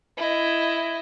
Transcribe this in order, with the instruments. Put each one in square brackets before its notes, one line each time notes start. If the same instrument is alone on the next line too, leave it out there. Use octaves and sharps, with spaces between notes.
[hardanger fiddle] E4 D#5